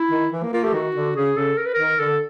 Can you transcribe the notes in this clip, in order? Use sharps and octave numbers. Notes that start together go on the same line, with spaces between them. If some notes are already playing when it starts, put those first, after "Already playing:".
Already playing: E4
D#3
E3
A#3
A#3 F4
A3 G4
D#3 F#4
D3
C#3 G#4
C#3 A4
A#4
B4
A#4
D#3
D3 A4